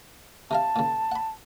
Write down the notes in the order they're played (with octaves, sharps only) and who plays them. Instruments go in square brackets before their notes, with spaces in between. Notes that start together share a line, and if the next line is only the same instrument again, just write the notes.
[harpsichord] C3 A#4 F5 [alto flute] A5
[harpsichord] A#2 C#3
F#5 B5